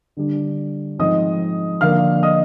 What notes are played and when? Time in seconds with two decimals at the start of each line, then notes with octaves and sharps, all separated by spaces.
0.17 D3 G3 D4
0.99 G#2 F3 C4 D#4 D#5 D#6
1.81 D3 F3 A#3 D4 F5 F6
2.23 D#5 D#6